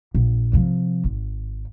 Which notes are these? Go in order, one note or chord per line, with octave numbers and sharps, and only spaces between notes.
A#1
C3 F3
G#1